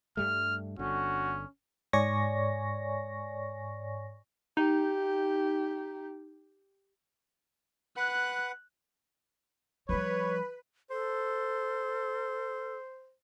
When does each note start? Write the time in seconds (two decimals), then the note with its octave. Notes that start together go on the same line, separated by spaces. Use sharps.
0.17 G2 G3 A3 F6
0.79 G1 D3 C#4 F#4
1.93 G#2 C#5 D5 G#5 C#6 A#6
4.57 D#4 G4
7.97 B4 F#5 F#6
9.89 F3 G3 B4 C#5
10.90 A4 C5